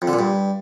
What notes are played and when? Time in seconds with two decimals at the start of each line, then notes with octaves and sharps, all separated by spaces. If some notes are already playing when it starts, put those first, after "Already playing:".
0.02 F2
0.08 D3
0.13 A#2
0.19 G2